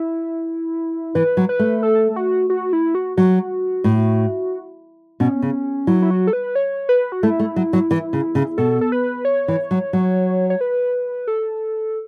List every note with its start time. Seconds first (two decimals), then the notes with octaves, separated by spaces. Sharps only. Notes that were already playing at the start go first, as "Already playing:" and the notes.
Already playing: E4
1.15 E3 B4
1.37 F#3
1.49 B4
1.59 A3
1.83 A4
2.16 F#4
2.50 F#4
2.73 E4
2.95 F#4
3.17 F#3 F#4
3.84 A2
5.20 B2 C#4
5.42 C#3
5.87 F#3 E4
6.02 E4
6.11 F#4
6.27 A4
6.33 B4
6.55 C#5
6.89 B4
7.12 F#4
7.23 A3 E4
7.40 A3
7.56 F#3
7.73 F#3
7.91 E3
8.13 C#3
8.35 C#3
8.58 B2 A4
8.81 A4
8.92 B4
9.25 C#5
9.48 E3
9.71 F#3
9.93 F#3
10.50 C#5
10.61 B4
11.27 A4